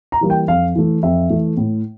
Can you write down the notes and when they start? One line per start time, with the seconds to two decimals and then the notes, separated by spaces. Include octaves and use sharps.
0.12 A#5
0.21 E3 G3 A#3
0.30 G5
0.48 F2 F5
0.75 E3 A3
1.03 F2 E5
1.30 E3 A3
1.57 A2